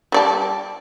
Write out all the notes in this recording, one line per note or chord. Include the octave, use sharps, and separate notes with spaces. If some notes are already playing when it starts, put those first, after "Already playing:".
G3 D5 A5